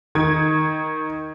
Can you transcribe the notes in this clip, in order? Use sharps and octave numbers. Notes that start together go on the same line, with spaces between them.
D#3 G#6